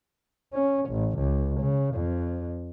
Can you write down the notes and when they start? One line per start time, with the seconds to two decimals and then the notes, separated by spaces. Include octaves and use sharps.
0.53 C#4
0.90 A1
1.19 C#2
1.61 C#3
1.96 F2